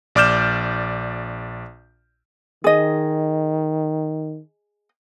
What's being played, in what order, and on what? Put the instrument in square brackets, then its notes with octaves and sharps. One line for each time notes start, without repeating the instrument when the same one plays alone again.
[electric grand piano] A#1 D5 D6 F6 G6 E7
[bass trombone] D#3 [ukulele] G#4 D#5